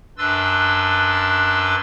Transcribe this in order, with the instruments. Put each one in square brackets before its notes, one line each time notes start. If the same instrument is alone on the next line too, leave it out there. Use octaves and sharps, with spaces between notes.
[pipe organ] F#2 D4 B4 C6 E6 A6